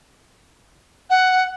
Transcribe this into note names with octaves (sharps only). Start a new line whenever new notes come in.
F#5